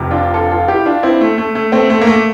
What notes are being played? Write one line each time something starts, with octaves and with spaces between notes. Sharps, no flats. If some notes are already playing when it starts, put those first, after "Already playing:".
Already playing: F1 F2 C3
D4 F4
F4 A4
F4 A4
E4 G4
D4 F4
C4 E4
A3
A3
A3
A3 C4
A3
A#3
A3